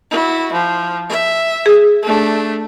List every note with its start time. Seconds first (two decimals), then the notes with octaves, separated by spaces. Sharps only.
0.11 E4 F#4
0.53 F3
1.10 E5
1.66 G#4
2.03 A3 D4